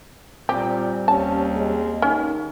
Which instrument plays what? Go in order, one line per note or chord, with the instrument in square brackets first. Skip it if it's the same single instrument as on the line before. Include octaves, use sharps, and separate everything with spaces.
[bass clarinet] A#2 [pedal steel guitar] G3 C4 [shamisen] G4
[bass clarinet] D#2 [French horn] C#4 [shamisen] A5
[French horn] G#3
[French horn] D#3 [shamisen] C#4